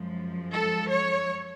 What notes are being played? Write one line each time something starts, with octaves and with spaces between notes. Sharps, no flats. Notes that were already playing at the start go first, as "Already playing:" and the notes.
Already playing: F#2 F3 G#3
A4
C#5